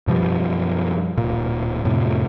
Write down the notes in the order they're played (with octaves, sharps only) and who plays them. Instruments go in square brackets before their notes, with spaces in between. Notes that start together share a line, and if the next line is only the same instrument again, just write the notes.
[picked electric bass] F#2 B2 F3 G3
D1 A#2
F2 A2 C3